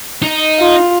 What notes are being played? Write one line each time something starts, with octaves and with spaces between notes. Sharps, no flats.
D#4
F4